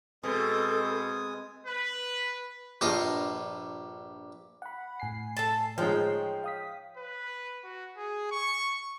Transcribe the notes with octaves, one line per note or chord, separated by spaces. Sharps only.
B2 G#3 C4 A4 G#5 D#6
B4
A#1 G2 F4 D#5
F#5 B5
A2 G#5 C7
A4 A5
F3 G#3 D#4 C#5 G5
F5 D#6 B6
B4
F#4
G#4
C#6